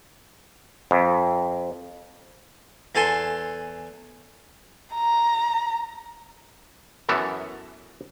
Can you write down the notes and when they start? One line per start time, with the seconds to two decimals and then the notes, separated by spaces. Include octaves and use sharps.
0.91 F2
2.95 E2 A4 G#5 C6
4.93 A#5
7.09 F#2 E3 B3 A4 A#4